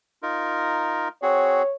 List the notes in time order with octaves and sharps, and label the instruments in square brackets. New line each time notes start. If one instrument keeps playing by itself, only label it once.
[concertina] D#4 F4 A#4
[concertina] C4 F#4 G#4 [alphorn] C#5